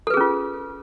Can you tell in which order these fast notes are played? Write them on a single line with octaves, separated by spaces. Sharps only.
A4 B4 G#4 C#4 F4